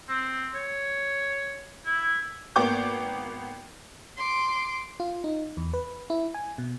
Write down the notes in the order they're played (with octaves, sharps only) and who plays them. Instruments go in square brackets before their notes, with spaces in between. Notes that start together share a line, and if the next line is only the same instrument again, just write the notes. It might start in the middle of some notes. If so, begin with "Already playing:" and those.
[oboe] C4
C#5
E4
[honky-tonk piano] G#1 A#3 B3 G5 D6 G6
[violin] C6 D6
[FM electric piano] F4
D#4
E2
B4
E4
G#5
B2